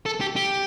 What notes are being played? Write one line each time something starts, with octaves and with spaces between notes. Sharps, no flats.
A4
G4
G4